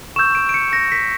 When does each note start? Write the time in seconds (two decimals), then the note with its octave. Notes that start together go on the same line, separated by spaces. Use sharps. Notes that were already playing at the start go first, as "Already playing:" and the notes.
0.16 C#6 E6 G6 E7
0.35 D7
0.49 D7
0.54 C#7
0.73 A#6
0.92 B6